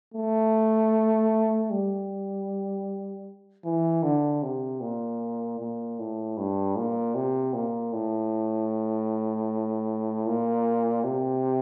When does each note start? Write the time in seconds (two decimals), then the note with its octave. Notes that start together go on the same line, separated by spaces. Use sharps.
0.14 A3
1.70 G3
3.65 E3
4.03 D3
4.43 C3
4.81 A#2
5.60 A#2
5.99 A2
6.38 G2
6.76 A#2
7.15 C3
7.54 A#2
7.93 A2
10.27 A#2
11.04 C3